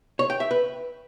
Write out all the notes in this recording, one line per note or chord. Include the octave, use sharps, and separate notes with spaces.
C#5
G5
E5
B4